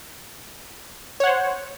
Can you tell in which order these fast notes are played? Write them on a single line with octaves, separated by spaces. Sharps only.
C#5 F#5 C5